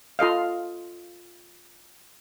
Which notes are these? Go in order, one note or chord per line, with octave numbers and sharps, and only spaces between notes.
F4 A4 D#5 F5